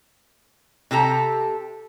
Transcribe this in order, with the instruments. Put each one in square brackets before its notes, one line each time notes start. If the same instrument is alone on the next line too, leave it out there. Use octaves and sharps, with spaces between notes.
[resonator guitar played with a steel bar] C3 G4 A4 A#5